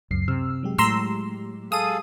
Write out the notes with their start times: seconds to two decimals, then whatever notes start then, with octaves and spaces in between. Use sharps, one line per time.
0.11 C#2 F#2 C7
0.28 C3 E6 F6
0.63 F#3 G#3 G4
0.78 A2 A#5 C6 E6
1.72 G#4 A4 F5 D#6 D#7